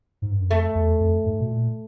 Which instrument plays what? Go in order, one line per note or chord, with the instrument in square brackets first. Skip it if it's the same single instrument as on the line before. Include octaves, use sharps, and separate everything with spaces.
[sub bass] G#2
G2
F#2
[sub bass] F2 [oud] A3
[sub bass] E2
F2
G#2
B2
A#2